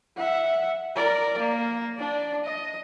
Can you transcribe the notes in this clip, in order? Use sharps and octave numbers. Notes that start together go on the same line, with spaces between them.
E5 F#5
A#4 D5
A#3
D4 D5
D#5